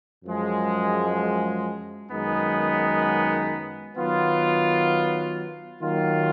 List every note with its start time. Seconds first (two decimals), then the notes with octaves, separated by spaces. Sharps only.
0.25 F#2 F3 G#3
2.11 F#2 D#3 G#3 B3 D#4
3.96 D#3 F#3 B3 F4
5.82 D#3 F#3 A#3 F4